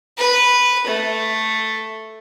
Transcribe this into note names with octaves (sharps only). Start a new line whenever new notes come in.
B4
A3